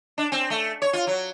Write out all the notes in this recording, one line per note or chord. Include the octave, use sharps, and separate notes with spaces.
D4
C4
A3
C#5
F4
F#3